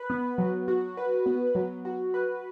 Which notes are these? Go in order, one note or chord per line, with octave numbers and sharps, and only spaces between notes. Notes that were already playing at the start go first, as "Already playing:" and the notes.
Already playing: B4
B3
F#3
F#4
B4
B3
F#3
F#4
B4